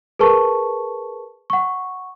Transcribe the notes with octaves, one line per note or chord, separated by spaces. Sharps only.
G#4 A#4 B4 A5 C#6
F#5 C#6